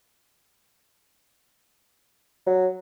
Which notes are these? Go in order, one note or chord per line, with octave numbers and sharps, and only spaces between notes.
F#3